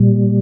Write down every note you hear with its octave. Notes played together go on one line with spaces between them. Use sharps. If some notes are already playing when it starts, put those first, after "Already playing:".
Already playing: A#2 G3